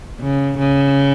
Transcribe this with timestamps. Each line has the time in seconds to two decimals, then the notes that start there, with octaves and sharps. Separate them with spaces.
0.21 C#3
0.59 C#3